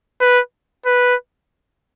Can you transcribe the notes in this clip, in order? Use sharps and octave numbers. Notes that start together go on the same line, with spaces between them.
B4
B4